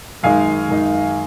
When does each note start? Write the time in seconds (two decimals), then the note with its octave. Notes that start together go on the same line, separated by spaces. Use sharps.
0.23 F#2 D#3 G#3 D#4 F5 G#5
0.69 F#2 D#3 G#3 D#4